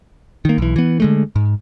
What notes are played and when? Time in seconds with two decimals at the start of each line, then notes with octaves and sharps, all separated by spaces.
0.45 D#3 A#3
0.58 B1 E3
0.76 E3 B3
1.00 D3 G#3 A3
1.36 G#2